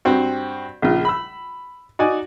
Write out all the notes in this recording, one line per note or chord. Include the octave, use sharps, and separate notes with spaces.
G2 C4 F#4
A#1 C#3 F4
B5 E6
D#4 F#4 D5 G#5